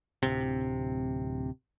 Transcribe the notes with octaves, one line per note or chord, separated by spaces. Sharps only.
D1 C3